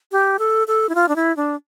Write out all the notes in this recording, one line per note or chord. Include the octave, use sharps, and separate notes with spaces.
G4
A4
A4
E4
F4
D4
E4
D4